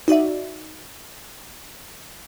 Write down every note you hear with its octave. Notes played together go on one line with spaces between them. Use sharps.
D#4 F#4 D5 E5